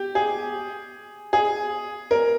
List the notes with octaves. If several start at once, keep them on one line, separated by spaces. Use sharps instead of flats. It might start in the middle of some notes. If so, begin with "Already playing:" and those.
Already playing: G4
G#4
G#4
A#4